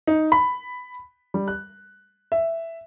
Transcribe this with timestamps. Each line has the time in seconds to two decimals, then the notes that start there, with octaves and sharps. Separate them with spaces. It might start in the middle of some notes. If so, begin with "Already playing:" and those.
0.07 D#4
0.32 B5
1.34 G3
1.48 F#6
2.32 E5